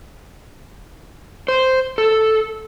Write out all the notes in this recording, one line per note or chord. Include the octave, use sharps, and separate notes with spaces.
C5
A4